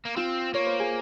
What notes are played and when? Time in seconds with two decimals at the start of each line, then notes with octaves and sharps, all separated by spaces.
0.05 A#3
0.16 C4 F4
0.54 A#3 C#5
0.66 C5
0.80 G#4